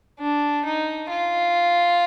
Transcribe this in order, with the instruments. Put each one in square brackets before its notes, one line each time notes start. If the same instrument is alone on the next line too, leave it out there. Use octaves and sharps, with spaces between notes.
[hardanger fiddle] D4
D#4
F4